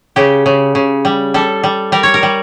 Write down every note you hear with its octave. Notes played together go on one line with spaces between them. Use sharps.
C#3 G4
C#3
C#3
G3
G3 A4
G3
G3 A#4
C#5
A#4
G3